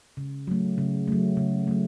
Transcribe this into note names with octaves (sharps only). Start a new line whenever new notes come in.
C#3
F#3 A3
C#3
F#3 A3
C#3
F#3 A3